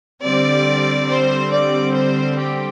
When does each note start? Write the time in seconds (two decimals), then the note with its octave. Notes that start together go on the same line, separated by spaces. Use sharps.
0.24 D3 G3 C4 D5
1.09 C5
1.52 D5
1.95 C5
2.38 G4